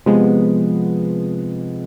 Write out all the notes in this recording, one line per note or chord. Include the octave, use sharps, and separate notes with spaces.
C3 F3 G#3 B3